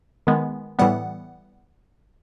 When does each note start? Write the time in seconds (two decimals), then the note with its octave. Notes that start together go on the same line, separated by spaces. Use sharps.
0.27 D#3 G#3 B3
0.79 A2 E3 G3 B3 F#5